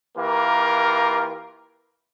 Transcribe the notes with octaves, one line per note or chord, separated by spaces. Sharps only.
E3 A#3 F4 G4 A#4